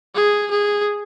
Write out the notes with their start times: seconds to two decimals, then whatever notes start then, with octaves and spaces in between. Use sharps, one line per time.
0.15 G#4
0.51 G#4